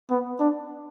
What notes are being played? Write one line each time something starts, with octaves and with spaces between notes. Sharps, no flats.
B3
D4